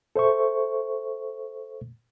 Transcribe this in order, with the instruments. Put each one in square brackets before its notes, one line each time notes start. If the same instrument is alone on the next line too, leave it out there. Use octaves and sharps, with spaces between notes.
[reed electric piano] A4 C5 E5 C#6